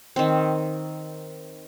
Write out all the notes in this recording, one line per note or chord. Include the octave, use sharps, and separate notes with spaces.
D#3 C4